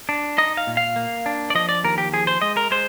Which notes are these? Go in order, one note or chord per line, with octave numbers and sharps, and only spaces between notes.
D4
D#4 D#5
F5
A#2
F5
A#3
D4
D5
F3 D#5
D5
D#2 A#4
G4
F3 G#4
C5
G#3 D#5
A#4
G#3 C5